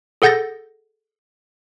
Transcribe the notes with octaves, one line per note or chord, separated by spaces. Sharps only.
G#4 A4 F#5 G6 A6 A#6